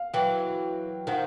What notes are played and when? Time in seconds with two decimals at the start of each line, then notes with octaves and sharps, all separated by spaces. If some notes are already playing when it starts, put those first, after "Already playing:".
Already playing: F5
0.14 E3 F#3 G5
1.07 D#3 F3 F#5